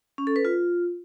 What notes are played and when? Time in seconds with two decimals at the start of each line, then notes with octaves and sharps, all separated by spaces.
0.18 C#4
0.27 A4
0.36 B4
0.45 F4